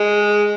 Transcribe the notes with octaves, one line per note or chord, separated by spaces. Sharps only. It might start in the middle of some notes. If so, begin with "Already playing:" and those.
Already playing: G#3